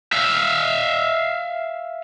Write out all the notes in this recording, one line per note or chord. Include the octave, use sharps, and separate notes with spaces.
E5 F5